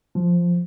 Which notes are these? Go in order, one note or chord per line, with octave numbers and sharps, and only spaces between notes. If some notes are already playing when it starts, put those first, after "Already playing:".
F3